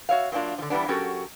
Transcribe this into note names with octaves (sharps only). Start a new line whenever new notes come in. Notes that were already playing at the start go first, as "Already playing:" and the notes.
F#4 C#5 E5 F5
F#3 A#3 C4 D4 F4
D3 F3
E3 G3 G#3 B3 D4
F#3 C#4 F#4 G4 A4 A#4